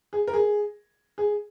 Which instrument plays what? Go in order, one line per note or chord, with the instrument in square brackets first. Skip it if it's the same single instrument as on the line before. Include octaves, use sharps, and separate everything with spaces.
[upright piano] G#4
A#4
G#4
G#4